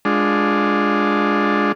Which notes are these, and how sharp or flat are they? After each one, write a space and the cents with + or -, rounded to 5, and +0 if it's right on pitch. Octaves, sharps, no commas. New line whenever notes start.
G#3 +0 D4 +0 F4 +15